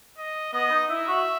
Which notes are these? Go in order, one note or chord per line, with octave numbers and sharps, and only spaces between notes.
D#5
B3 D#5
D#4
E4 E5
F#4